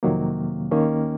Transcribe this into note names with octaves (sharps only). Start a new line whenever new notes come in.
F2 C3 D#3 F#3 A#3
D#2 D#3 A#3 C#4